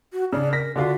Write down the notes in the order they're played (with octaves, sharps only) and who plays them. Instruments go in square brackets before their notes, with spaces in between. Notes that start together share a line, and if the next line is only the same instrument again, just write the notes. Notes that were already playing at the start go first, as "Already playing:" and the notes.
[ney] F#4
[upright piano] C#3 D4 [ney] D5
[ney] A#4 [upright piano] A#6 B6
[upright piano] D3 D4 F4 [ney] F#4